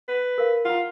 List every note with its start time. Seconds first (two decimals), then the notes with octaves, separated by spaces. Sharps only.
0.08 B4
0.38 A#4 F5
0.65 E4 F4 F#5